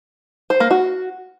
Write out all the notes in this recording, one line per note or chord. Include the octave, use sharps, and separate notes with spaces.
C5
A#3
F#4